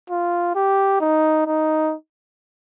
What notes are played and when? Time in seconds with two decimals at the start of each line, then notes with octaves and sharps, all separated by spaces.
0.10 F4
0.56 G4
1.01 D#4
1.46 D#4